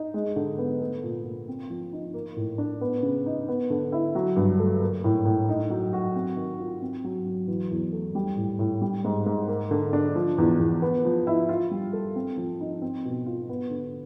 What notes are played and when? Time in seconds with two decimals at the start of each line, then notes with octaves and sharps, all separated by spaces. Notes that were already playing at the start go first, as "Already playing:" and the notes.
Already playing: D#4
0.14 G#3
0.36 D3
0.58 B3
0.81 A3
1.04 A#2
1.25 A#2
1.48 C4
1.70 F3
1.92 D#4
2.14 A#3
2.36 A2
2.58 D4
2.81 B3
3.03 C#3
3.26 D#4
3.48 B3
3.70 D3
3.92 E4
4.15 F#3
4.36 G2
4.59 A3
4.82 A#3
5.04 A2
5.25 A2
5.49 D#4
5.70 F#3
5.93 F#4
6.15 C4
6.36 D#3
6.59 F4
6.82 C4
7.04 F#3
7.26 F#3
7.48 E3
7.71 E2
7.93 A3
8.15 G3
8.37 A2
8.59 A2
8.81 G3
9.05 G#2
9.26 G#2
9.48 A#3
9.71 D3
9.93 D4
10.16 F3
10.38 E2
10.59 E2
10.82 B3
11.05 F3
11.27 E4
11.49 F4
11.71 G3
11.93 A4
12.16 C4
12.37 F3
12.60 D#4
12.82 C4
13.05 B2
13.26 F4
13.49 B3
13.71 D3